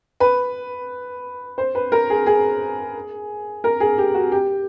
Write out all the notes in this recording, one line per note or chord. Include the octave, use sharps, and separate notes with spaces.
B4
C5
B4
A#4
G#4
G#4
A#4
G#4
G4
F#4
G4